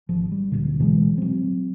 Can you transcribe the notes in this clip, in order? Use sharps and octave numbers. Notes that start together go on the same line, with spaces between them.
G#1 F3
G3
D1 A#2 D3
B2 E3 F#3 G#3
F#3 C4